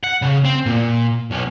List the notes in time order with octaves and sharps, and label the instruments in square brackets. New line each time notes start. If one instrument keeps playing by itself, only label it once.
[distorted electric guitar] F#5
C#3
C4
A#2
B1